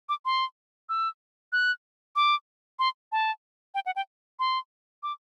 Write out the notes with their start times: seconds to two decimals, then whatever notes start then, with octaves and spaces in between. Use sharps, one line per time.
0.09 D6
0.25 C6
0.89 E6
1.53 F#6
2.16 D6
2.79 C6
3.12 A5
3.75 G5
3.86 F#5
3.96 G5
4.39 C6
5.03 D6